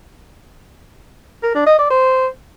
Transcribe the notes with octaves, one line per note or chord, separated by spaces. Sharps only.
A#4
D4
D#5
D5
C5